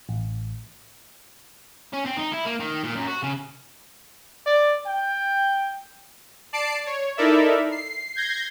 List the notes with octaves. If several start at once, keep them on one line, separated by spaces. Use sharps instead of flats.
A1
C#4
C4
D#4
E4
A#3
D#3
A#2
F#2
F#4
C#3
D5
G5
D5 A5 C7 D7
C#5
D#4 E4 A4 A#4 D5 E5
C7
G6 G#6 A#6 C7